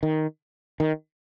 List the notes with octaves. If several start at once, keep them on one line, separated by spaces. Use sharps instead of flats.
D#3
D#3